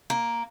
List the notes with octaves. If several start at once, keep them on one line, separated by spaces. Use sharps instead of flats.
A#3